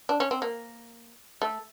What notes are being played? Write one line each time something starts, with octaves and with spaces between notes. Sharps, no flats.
D4
C#4
C4
A#3
A3